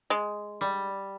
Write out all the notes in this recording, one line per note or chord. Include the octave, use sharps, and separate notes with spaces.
G#3
G3